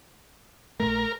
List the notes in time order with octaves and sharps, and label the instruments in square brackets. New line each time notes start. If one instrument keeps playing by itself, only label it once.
[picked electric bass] A#1 A#2 A3 [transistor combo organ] A#4